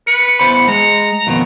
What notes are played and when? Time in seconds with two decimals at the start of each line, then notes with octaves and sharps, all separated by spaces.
0.07 B4 C#7
0.39 E2 C5 B5
0.68 G#3 A#5
1.27 F2 B2 D#3